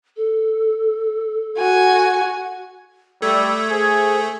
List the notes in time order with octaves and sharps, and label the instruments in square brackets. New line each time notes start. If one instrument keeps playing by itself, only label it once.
[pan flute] A4
[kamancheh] F#4 G#5
[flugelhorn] G3 [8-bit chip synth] A3 [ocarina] E6 [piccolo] G#6
[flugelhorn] G#4 [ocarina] C5